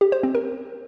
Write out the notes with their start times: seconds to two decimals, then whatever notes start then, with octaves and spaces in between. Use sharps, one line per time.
0.01 G4
0.12 C5
0.23 C4
0.35 A#4